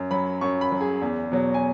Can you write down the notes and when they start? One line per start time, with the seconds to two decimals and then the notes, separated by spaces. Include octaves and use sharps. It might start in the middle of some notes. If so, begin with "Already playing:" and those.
Already playing: F#2
0.11 F#3 B5
0.41 F#2 C#6
0.61 B5
0.72 F#3
0.81 G#4
1.02 E2
1.32 B2 F#3
1.54 G#5